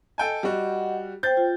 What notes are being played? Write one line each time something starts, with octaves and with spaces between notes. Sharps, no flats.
A4 D#5 G5 G#5
G3 F#4 D#5 F#5
C5 G5 G6 A6
F4